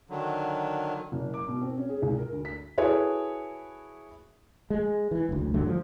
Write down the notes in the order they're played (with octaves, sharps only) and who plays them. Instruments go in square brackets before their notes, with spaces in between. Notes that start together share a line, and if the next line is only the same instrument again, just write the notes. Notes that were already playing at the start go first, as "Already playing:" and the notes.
[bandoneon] D3 D#3 F#3
[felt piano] F#1
D6
B2
C4
C#4
G#4
C#2
A#4
D2
B6
E4 F#4 G#4 A4 B4 C#5
[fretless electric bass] G#3
E3
F#1 D2
G2 D3 F#3 A3
F3